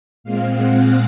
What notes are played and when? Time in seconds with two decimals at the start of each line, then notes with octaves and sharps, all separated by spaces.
0.24 A#2 G#3 C4 F5
0.57 F#5